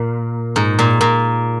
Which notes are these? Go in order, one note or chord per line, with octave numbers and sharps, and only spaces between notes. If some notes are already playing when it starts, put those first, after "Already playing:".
Already playing: A#2
G#2
A#2
A#2